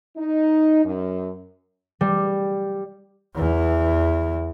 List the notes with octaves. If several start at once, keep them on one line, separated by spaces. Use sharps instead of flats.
D#4
F#2
G3
E2 E3